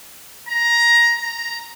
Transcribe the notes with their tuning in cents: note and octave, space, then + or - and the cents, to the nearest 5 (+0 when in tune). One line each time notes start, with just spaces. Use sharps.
A#5 +15
A#5 +0